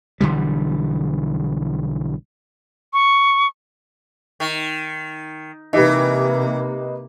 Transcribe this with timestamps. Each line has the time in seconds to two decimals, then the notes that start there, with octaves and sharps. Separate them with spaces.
0.21 B1 D3 E3 G3
2.93 C#6
4.40 D#3
5.73 C3 E3 A#3 D#4 G4 B4